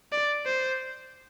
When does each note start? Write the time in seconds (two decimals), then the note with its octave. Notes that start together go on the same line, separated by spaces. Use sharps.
0.12 D5
0.46 C5